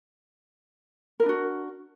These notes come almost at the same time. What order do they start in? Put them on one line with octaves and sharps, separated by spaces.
A#4 E4 D4 F#4